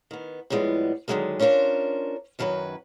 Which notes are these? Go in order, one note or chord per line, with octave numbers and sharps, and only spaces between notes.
D#3 B3
A2 F3 G3 G#3 B3
D3 D#3 F3 F#3 G#3 A#3
C#4 D4 F4 A#4 C5
F#2 D#3 F#3 G#4 B4